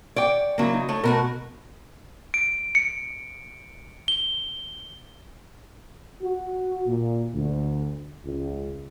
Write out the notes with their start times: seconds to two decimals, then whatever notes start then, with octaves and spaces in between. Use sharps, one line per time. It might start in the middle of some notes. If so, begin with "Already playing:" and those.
0.16 C#5 D5 G5
0.58 C#3 F#3 A#3 E4
0.73 D#4
0.89 A3 C#5
1.03 B2 A3 F#4 A#4
2.34 D7
2.75 C#7
4.08 G7
6.23 F#4
6.88 A#2
7.35 D2
8.26 C#2